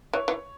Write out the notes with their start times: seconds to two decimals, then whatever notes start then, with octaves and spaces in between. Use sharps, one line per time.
0.13 E3 C#5
0.28 E3